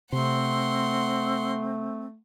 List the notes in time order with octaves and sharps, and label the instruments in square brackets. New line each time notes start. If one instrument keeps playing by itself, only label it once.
[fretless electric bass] C3 [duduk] A3 [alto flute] C4 [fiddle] F#5 C6